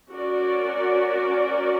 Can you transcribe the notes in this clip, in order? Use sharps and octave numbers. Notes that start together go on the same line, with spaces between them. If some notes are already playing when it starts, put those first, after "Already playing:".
C#4 F#4 A#4 D5